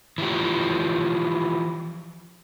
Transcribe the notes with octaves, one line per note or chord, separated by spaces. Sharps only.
E3 F3 G4